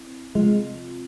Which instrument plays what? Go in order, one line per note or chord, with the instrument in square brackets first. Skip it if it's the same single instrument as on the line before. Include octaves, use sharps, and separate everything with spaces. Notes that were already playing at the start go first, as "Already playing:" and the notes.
Already playing: [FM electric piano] C4 E4
[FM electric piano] C3 F3 C4 F4 [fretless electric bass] G#3